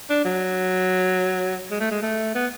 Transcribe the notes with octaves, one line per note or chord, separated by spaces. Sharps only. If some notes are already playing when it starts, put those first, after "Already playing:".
D4
F#3
G#3
A3
G#3
A3
B3